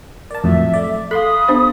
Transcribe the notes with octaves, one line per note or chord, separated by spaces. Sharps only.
A#4 D5 A5
F2 A2 F#3 E5
A3 D5
A4 F5 B5 C6 D#6
B3 D4 C5